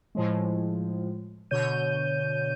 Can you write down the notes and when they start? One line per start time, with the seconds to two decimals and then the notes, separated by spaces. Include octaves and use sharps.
0.15 A2 F3 G#3
1.51 B2 D3 C#5 G6 D#7